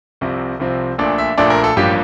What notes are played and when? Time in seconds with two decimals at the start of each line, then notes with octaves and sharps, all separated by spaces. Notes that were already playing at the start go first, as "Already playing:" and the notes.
0.21 C2 C3 F3 C4
0.60 C2 C3 F3 C4
0.98 A#1 A#2 A3 D4 D5
1.18 E5
1.37 A#1 A#2 A3 D4 D5
1.50 A#4
1.64 A4
1.76 A1 G2 F3 A#3 G4